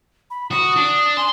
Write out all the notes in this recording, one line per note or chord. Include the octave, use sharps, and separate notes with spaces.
B5
F#4 D#6
D4
G#5 C6